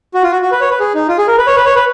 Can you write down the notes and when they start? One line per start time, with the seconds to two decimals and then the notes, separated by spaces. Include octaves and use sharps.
0.14 F#4
0.23 F4
0.32 F#4
0.42 F#4
0.52 B4
0.61 C#5
0.70 B4
0.80 G#4
0.94 D#4
1.09 F4
1.18 G#4
1.28 A#4
1.38 B4
1.47 C#5
1.56 B4
1.66 C#5
1.76 B4